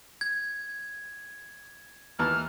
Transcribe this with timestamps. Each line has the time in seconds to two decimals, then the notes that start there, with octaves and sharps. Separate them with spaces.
0.21 G#6
2.19 D#2 E3 A5 F6